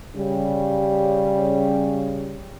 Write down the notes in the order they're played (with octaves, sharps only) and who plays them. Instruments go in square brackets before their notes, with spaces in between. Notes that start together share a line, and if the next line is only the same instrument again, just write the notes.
[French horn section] C#3 G3